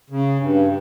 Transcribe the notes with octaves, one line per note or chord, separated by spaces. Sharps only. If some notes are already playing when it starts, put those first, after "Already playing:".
C#3
G2